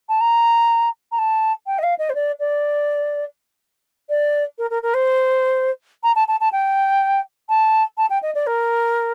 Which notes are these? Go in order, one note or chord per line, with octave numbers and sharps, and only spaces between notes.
A5
A#5
A#5
A5
G5
D#5
F5
D#5
C5
D5
D5
D5
A#4
A#4
A#4
C5
A#5
A5
A5
A5
G5
A5
A5
G5
D#5
D5
A#4